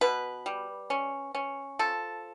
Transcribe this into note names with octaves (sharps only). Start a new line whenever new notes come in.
B2 B4
G3
C#4
C#4
F3 A4